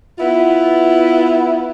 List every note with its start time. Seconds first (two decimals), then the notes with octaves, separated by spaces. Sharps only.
0.19 B3 E4 F4